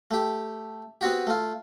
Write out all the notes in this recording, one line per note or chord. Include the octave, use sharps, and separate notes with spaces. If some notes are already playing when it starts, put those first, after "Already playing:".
A3 G4
B3 C4 F#4 G4
A3 F4